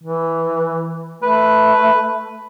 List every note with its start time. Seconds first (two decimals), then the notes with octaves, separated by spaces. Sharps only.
0.04 E3
1.23 A3 B4